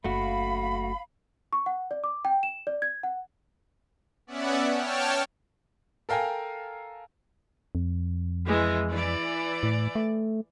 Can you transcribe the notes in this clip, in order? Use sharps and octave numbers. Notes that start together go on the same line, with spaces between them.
F#1 F#2 A3 F#4 F5 B5
C#6
F#5
D5
D6
G5
E7
D5
G#6
F#5
B3 C#4 D5 E5 F#5
C#5 G5 A5 F6
A4 A#4 F5 G5 G#5 A#5
F2
E3 G#3
E3 D5
A2
A3